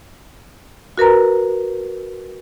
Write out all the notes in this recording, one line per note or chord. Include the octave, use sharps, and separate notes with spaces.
F#4 A#4 B4 A#5